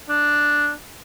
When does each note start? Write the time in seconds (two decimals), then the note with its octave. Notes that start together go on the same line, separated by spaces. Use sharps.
0.09 D4